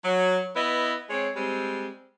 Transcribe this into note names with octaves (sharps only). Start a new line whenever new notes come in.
F#3
B3 E4 B4 D#5
G#3 C4 C#5
G3 G#3 C4